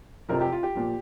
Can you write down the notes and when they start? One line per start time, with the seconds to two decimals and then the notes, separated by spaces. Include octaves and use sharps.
0.29 F1 F2 C3 F3 A#4
0.41 G4
0.52 F4
0.63 G4
0.75 A#2 F3